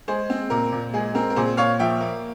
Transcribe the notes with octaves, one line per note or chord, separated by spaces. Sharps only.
G#3 G#4 C5
C4
A#2 A#4
A#2
G#3 G#4
C4 A#4
A#4
A#2 G#4 C5
A#2 C#5 F5
F3 E5 G5
A#3